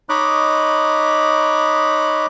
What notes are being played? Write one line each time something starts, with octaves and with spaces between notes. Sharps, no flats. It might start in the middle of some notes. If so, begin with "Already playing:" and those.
D#4 C#5 D#5 B5 D6 F#6